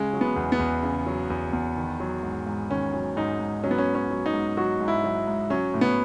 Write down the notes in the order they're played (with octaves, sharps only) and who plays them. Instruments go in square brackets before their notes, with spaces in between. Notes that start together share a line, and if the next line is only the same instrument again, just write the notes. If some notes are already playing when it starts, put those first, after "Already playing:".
Already playing: [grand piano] C#3 G#3
F#3
B3
E2
B3
E2
C#3
F#3
E2
E2
D#3
F#3
G#2
G#2
D#3 C#4
F#3
G#2 D#4
G#2
F#3 C#4
B3
C#4
G#2
C#4
F#3
D#4
G#2
F#3 F#4
G#2
E4
F#3
G#2
F#3 C#4
A2
B3